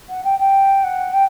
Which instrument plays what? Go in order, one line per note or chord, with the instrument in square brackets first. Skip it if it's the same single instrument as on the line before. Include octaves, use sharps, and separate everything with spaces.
[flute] F#5
G5
G5
F#5
G5